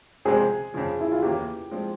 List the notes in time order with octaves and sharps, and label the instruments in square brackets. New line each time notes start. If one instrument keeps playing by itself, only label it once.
[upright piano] C#2 C3 F3 G#3 C4 [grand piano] G#4
[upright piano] F2 C#3 F3
[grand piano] E4
F4
[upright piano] E2 E3 A#3 C#4 E4 [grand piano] G4
[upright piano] F3 G#3 C4 F4